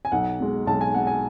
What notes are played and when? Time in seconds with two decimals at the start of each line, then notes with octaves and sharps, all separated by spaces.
0.05 G#5
0.12 B1 F#5
0.40 B2 G#3
0.66 B1 A5
0.81 G#5
0.94 B2 G#3 F#5
1.07 G#5